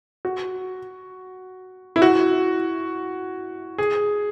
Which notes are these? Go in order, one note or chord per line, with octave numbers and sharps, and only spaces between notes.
F#4
E4
F#4
G#4